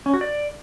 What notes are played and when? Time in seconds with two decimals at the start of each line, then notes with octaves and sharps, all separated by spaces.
0.06 C#4
0.14 F#4
0.21 D5